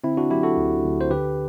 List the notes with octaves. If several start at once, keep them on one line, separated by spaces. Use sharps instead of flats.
D3 C4 E4
D4 F#4
F#3 E4 G4
F#4 A4
D2
D2
C5
D3 G4 B4